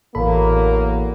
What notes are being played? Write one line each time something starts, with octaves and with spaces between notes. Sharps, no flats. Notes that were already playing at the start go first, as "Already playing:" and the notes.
A1 E2 F#3 A#3 A4 B5